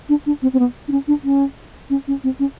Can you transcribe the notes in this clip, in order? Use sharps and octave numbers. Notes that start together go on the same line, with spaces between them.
D4
D4
C4
C4
B3
D4
C#4
D4
C#4
C#4
C#4
C4
C#4